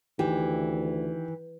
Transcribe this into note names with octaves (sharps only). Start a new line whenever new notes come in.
D2 D#3 E3 G4